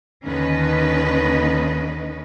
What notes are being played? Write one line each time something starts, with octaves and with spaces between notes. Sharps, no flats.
D#2 D3 D#3 C#4 B4 D#5